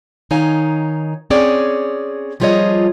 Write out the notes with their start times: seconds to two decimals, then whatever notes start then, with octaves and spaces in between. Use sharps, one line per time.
0.31 D#3 D#4 C#5 F5 G#5
1.30 C4 C#4 G#4 C#5 D5
2.40 F3 G3 F4 G#4 C#5 D#5